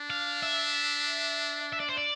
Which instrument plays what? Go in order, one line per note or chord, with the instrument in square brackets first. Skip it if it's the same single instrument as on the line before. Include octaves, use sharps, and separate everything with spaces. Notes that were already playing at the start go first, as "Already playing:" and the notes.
Already playing: [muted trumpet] D4
[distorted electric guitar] F5
E5
E5
D5
C5
D5